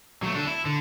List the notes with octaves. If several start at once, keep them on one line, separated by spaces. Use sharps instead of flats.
F#3 A3
D4 A4
E4
D3